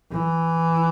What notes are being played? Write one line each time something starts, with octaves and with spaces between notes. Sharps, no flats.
E3